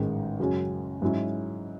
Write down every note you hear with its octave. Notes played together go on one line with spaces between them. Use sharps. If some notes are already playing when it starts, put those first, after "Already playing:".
Already playing: A1 G#2 D#3 G#3
F#2 C#3 G#3 C#4 F#4
G#2 F#3 C#4 E4